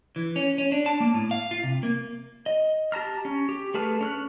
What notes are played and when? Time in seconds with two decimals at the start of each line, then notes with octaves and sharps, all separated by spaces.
0.16 E3
0.36 C#4
0.58 C#4
0.72 D4
0.86 A5
1.00 A#3
1.14 A2
1.31 F5
1.51 F4
1.64 C3
1.83 A#3
2.46 D#5
2.92 G4 A5 A#5 F6
3.25 C#4
3.49 G4
3.74 A3 G#4 B4 A5 F6
4.01 C#4 F6 F#6